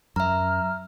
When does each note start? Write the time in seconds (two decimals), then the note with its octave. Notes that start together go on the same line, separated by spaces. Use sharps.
0.16 F#2 E5 A#5 F6